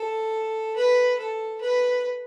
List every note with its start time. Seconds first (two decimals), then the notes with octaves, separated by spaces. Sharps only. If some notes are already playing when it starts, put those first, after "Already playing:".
Already playing: A4
0.76 B4
1.19 A4
1.61 B4